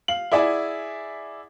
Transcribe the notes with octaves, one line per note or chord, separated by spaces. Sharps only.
F5 F#7
E4 G#4 D5 E5 F#5 G#5